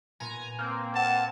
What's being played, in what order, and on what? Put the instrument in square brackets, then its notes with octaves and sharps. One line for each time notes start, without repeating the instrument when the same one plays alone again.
[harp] A#2 B3 [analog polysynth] G#5 A#5
[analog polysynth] A#3 C4 [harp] G#6
[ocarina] F#5 [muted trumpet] A5